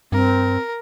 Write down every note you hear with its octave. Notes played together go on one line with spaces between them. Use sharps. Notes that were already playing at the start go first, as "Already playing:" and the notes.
G2 C4 A#4